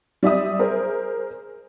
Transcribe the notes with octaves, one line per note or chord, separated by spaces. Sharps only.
G3 D5 E5 D#6
G#4 A#4 C5